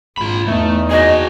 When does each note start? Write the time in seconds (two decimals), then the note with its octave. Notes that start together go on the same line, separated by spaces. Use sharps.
0.18 G#1 F4 B5
0.47 E2 A3 D#4
0.91 F#4 G#4 D#5